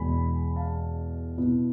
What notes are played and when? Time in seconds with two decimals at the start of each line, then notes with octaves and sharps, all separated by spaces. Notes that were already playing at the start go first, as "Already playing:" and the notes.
Already playing: E2 B2 G#3 G#5 B5
0.56 F5 A5
1.38 B2 B3 E4